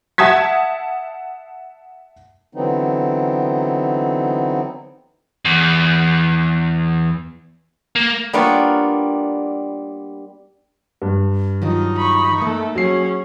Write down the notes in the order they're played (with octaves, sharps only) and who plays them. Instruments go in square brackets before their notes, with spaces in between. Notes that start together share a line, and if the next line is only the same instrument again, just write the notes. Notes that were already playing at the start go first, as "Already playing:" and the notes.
[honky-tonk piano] E5 F#5 A5 D#6 G#6 B6
[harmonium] D3 E3 F#3 B3 C4 D#4
[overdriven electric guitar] E2
A#3
[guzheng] G3 A#3 B3 D4 F4 C#5
[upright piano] G2
[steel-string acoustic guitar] D#3 F#3 F4 [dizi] D#4
[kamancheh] B5 C#6
[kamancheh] A3 A4 [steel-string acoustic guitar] A#3
[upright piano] F#3 C7 [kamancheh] C#4 G#4